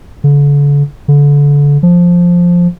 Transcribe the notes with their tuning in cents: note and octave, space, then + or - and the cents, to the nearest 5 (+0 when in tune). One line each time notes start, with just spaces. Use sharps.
D3 -40
D3 -30
F3 +5